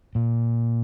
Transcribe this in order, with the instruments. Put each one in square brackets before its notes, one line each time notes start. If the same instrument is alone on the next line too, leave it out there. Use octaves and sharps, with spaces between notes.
[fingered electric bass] A#2